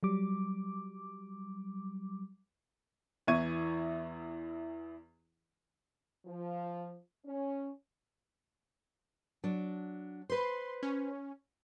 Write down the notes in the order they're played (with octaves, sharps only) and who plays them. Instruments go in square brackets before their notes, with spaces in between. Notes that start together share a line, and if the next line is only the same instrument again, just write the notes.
[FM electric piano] F#3 G3 D6
[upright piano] E2 E3 E4 C#6 G#6 D#7
[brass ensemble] F3
C#4
[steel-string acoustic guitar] F#3 D4
[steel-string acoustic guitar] B4 C5 [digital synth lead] C6
[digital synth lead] C#4